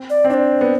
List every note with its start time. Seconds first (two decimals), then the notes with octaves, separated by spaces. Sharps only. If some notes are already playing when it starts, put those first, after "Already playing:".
Already playing: C4
0.10 D5
0.25 C4
0.30 D4 D5
0.34 C5
0.61 B3